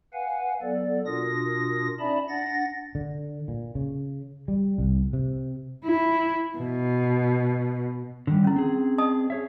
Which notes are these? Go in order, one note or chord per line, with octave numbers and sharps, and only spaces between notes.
B4 F5 F#5 G#5
F#3 B3 A4 D5
B2 D4 F4 A#4 D#6 A#6
C#4 D#4 D5 E5 A5 B5
D4 F#5 A6 A#6
D3
A#2
C#3
G3
C2
C3
E4
B2
D3 D#3 G3
C#4 E4
C4 G#4
D#5 A5 D#6
G#4 C#5 E5